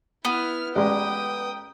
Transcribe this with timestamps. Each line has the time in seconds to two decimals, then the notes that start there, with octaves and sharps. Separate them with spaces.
0.25 B3 E4 F6
0.75 A1 G#3 D5 G5 D#6